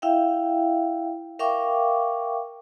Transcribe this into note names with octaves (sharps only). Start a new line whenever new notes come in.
E4 E5 F5 G5
A#4 E5 F5 G5 C#6 D6